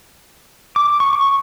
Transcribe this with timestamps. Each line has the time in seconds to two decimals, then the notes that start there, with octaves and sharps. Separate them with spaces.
0.76 D6
1.00 C#6
1.13 C#6